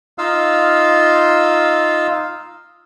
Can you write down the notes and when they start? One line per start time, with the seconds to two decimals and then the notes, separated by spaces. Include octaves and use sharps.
0.18 D#4 F4 F5 E6